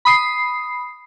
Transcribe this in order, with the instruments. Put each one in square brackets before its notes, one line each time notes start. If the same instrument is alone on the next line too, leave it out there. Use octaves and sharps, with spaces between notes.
[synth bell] B5 D#6 C7